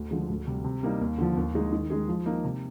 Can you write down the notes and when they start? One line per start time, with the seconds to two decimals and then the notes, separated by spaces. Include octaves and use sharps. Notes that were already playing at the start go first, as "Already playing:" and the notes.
Already playing: D2
0.11 D3 F3 G#3
0.29 D2
0.47 C3 G3
0.65 C3
0.83 G3 A#3 D#4
1.01 D#2
1.18 D3 F3
1.37 D#2
1.54 D3 G#3 D#4
1.72 D#3
1.90 G#3 D#4 G#4
2.08 F3
2.26 A#3 D#4 A#4
2.44 C3